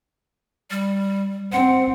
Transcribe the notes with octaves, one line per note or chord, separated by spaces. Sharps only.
G3
C4 F#5